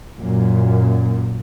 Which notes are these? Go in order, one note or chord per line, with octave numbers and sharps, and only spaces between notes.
F#2 A#2